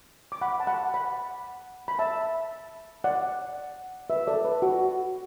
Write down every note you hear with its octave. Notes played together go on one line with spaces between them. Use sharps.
D6
F#5 B5
A5
F#5 B5
F#5 B5
B5
E5 A5
D5 F#5
B4 E5
A4 D5
B4
F#4